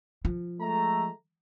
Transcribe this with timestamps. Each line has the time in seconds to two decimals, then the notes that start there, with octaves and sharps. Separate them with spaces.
0.25 F3
0.61 G#3 A3 A#5